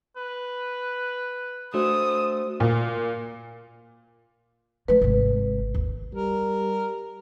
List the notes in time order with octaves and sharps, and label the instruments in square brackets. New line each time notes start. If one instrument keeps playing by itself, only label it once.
[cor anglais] B4
[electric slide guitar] A3 [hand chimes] D4 F#4 C5 [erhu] D#6
[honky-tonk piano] A#2
[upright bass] F3 A3 [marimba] B4
[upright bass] G#1 C3
D#2
[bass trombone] G3 [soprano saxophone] A#4